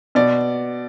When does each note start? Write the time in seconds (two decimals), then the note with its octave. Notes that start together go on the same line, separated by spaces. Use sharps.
0.15 B2 D5